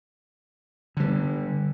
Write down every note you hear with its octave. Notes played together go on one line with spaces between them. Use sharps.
D3 G3